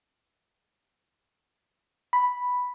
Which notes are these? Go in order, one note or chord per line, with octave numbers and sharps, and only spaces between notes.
B5